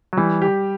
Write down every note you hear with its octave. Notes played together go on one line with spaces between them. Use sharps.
F#3
E3 G3
G4